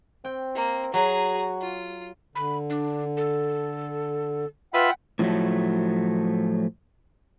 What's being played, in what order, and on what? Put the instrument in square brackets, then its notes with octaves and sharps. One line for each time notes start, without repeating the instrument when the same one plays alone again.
[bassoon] C4 [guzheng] G5
[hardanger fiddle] A#3
[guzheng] F#3 [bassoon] F#4 [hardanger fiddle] G#4 A#5
[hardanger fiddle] F4
[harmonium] D3 [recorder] B5
[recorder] D4
A4
[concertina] F4 E5 B5 [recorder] B4 [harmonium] F#5 G5
[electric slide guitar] A2 F3 F#3 A3